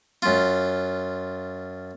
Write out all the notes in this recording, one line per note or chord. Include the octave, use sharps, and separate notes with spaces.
F#2 F4